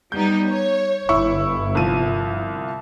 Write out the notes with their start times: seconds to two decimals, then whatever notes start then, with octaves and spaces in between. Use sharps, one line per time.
0.12 G3 B3 D#4 G6
0.48 C#5
1.09 G1 E4 C#6
1.75 C2 F3 D#7